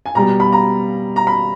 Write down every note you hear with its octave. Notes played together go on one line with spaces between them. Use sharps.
G#5
B2 G3 B3 A#5
B5
A#5
A#5
B5